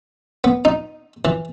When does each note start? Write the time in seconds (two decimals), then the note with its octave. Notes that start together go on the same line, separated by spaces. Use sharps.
0.44 B3
0.65 D#4
1.25 E3